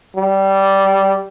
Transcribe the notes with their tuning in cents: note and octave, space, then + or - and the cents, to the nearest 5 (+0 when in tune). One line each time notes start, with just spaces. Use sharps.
G3 -15